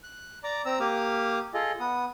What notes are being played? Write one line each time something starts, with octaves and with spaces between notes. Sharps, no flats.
F#6
D5 A#5 D6
C4 A#5 E6
A#3 G4 D6 D#6 F6
F4 G#4 A4 D#5
B3 D#6